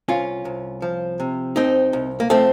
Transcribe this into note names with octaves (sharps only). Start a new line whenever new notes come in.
C2 C#4 F4
C2
F3
C3
C2 C4 D#4
C2
A#3
F3 A3 C4